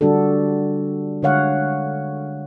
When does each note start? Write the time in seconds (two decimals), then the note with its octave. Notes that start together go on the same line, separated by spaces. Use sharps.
0.01 D3 G3 D4 F#4 A4
1.22 D3 G#3 C#5 F5 F#5